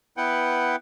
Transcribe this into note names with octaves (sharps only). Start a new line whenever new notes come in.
B3 E4 B4 F#5 G5